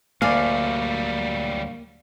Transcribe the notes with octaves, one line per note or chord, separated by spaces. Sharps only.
D2 F#3 G3 A#3 D5 F5 G#5